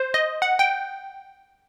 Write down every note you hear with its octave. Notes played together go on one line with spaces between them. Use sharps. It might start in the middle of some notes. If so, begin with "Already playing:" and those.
Already playing: C5
D#5
F#5
G5